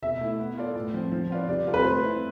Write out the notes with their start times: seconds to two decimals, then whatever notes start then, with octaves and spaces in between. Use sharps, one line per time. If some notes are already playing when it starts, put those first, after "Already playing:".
0.02 B2 E5
0.21 A3 E4
0.40 B3
0.57 F4 A4 D5
0.75 A2
0.94 F3 C4
1.12 F3
1.30 C4 F4 B4 D5
1.48 C3 D5
1.67 G3 C4 F4 A4
1.74 B4
1.84 A3 C5
2.03 C4 E4 B4